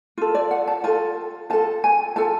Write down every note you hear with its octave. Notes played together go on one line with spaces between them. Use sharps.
F4 A4
D5
F#5
A5
F4 A4 A5
F4 A4 A5
G#5
F4 A4 A5